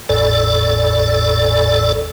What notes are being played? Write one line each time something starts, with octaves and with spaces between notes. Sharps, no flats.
G#1 E2 A2 A4 D5